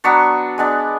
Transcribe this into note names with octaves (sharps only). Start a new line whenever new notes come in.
F#3 B3 D4 C#6
G#3 B3 D4